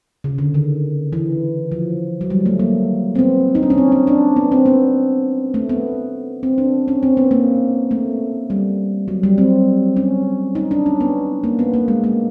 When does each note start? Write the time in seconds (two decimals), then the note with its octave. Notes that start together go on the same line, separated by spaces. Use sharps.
0.24 C#3
0.38 D3
0.54 D#3
1.13 E3
1.72 F3
2.21 F#3
2.30 G3
2.46 A3
2.59 A#3
3.15 C4
3.19 B3
3.55 D#4
3.63 D4
3.70 C#4
3.78 C4
3.92 C#4
4.07 D4
4.36 B3
4.52 C4
4.66 B3
5.54 A3
5.69 B3
6.43 C4
6.58 D4
6.88 C#4
7.03 C4
7.17 B3
7.31 A#3
7.91 A3
8.50 G3
9.08 F#3
9.23 G3
9.38 C4
9.96 C#4
10.55 D#4
10.71 D4
10.86 C#4
11.01 B3
11.44 A#3
11.59 B3
11.74 A#3
11.88 G#3
12.04 A#3